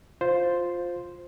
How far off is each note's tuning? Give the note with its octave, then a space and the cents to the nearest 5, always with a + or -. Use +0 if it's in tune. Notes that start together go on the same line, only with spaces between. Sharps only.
F4 +10 C5 +0